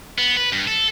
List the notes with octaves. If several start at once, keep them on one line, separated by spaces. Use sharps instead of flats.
B3
B4
G2
A4